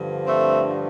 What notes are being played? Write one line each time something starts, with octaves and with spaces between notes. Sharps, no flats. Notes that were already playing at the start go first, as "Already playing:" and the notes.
Already playing: G2 D3 F3
A3 C4